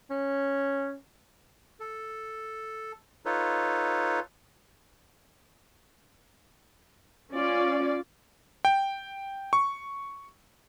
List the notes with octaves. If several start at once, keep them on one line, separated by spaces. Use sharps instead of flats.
C#4
A4
D#4 F4 A4 B4 C#5
C#4 F4 D5
G5
C#6